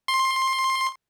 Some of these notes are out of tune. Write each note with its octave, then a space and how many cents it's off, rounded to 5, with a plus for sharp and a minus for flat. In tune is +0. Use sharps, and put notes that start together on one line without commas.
C6 +15